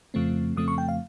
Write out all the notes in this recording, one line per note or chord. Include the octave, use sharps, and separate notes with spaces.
F2 C#3 F3 A3 C4
F2 C#3 F3 A3 C4 D#6
C#6
G5
F5